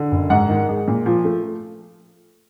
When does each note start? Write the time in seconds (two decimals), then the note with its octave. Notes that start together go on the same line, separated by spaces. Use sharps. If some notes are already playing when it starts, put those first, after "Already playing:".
Already playing: D3
0.11 F#1
0.30 G#2 F#5
0.49 D#3
0.69 G#3
0.88 A#2
1.06 F3
1.25 A3